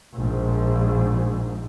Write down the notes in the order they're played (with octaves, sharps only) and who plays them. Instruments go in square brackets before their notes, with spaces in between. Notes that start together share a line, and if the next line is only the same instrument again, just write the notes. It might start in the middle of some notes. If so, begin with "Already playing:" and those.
[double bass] A#1 G#2